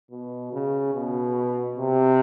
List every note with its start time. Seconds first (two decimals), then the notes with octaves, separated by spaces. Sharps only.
0.11 B2
0.52 C#3
0.94 B2
1.78 C3